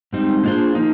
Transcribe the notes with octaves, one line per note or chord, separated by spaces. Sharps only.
G#2 G3 C4 D#4
A#3 D4 F4 G#4 C5
F3 A#3 D#4